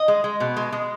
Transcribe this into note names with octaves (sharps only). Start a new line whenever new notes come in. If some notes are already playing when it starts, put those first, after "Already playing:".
Already playing: D#5
G#3
G#3
B2
G#3
G#3